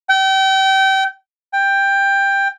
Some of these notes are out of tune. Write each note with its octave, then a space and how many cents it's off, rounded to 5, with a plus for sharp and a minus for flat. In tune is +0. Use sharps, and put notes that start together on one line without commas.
G5 -30
G5 +10